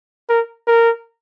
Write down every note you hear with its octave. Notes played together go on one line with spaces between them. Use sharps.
A#4
A#4